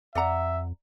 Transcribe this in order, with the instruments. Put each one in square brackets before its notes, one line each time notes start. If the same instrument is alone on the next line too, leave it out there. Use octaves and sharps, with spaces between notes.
[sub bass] F2 [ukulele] D5 F#5 A#5 [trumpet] E5